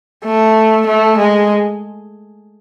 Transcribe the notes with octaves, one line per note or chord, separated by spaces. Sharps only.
A3
A3
G#3